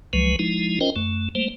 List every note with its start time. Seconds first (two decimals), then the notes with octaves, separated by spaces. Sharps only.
0.13 C#2 F3 F#3 G#3 B4
0.39 F3 G#3 D#4 E4
0.81 C#4 F4 A#4 C5 D#5 G5
0.96 F#2 A3
1.35 G3 A3 A#3 C5